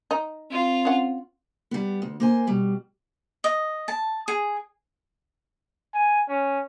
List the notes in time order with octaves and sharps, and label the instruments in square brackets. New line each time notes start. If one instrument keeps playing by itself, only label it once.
[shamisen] D#4
[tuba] C4 [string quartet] F4
[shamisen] C#4 F#5
[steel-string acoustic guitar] G3 B3
D2
A#3 C5 G#5
B2 G3
[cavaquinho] D#5
A5
G#4
[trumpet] G#5
C#4